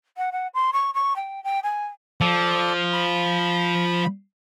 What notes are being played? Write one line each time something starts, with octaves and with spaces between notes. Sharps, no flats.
F#5
F#5
C6
C#6
C#6
G5
G5
G#5
F3 A4 D5
B5